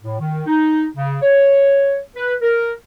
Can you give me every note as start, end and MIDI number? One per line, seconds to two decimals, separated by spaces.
0.03 0.19 45
0.20 0.42 51
0.46 0.85 63
0.96 1.18 49
1.22 1.97 73
2.16 2.34 71
2.42 2.73 70